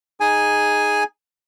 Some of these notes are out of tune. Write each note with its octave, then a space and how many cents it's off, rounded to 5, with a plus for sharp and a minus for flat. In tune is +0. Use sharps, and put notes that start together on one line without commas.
D#4 +0 G#4 +0 G#5 +0